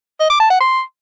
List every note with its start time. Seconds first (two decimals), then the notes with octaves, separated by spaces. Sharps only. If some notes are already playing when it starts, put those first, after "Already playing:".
0.20 D#5
0.30 D6
0.40 A5
0.50 F#5
0.60 C6